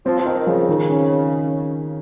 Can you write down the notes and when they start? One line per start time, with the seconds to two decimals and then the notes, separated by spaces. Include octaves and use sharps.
0.06 F3 C4
0.19 F3
0.26 D#3 A#4
0.46 C#3 F3
0.69 D#3
0.89 C#4